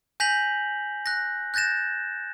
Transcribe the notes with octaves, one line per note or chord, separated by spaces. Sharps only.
G#5 G6 A#6 B6 F7 F#7
F#6 A#6
F#6 G6 A6 A#6 E7